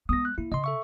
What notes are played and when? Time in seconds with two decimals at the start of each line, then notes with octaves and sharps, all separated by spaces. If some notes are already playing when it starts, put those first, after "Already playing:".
0.09 G#3 B3 D#6 A#6
0.25 F#6
0.38 A#3 E4
0.52 C#3 D#5 C6
0.64 A4 E5 C#6